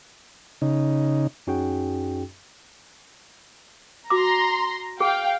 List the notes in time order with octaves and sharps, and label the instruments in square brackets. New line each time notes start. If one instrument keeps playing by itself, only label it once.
[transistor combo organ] C#3 D#4
[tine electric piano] F#2 C#4 D#4 F#4 G#4 G5
[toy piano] F#4 D6 [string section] A#5 C6
[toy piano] G#4 [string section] F5 G5